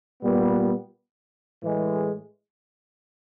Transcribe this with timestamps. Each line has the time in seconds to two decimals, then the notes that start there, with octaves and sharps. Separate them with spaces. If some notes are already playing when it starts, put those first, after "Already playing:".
0.22 A#2 G3 B3
1.63 A2 E3 G#3